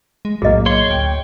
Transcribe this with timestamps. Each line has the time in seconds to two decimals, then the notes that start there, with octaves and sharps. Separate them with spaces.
0.25 G#3
0.42 B1 F#2 A2 A#3 G#4 D#5
0.66 C#5 C6
0.90 D2 G5